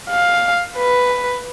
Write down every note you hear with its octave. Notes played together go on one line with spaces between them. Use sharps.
F5
B4